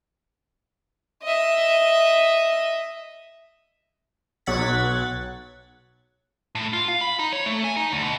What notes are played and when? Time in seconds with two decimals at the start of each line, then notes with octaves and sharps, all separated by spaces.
1.23 D#5 E5
4.46 B1 F#3 F#5 G#6 A6 B6
6.55 A2
6.73 F4
6.88 F5
7.01 B5
7.19 D#4
7.32 C#5
7.46 A3
7.64 G#5
7.76 D#4
7.92 D2
8.04 B2